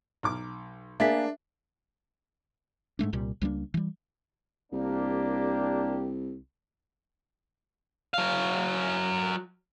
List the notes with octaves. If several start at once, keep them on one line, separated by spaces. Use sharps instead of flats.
B1 A#5 D6 F6
A#3 D4 G#4 E5 A6 B6
G#2 G#3 A3 D4
C2 A#2 G3
C#2 G3 A#3 D4
E3 G3
C2 A#3 D4 G4
F#3 F5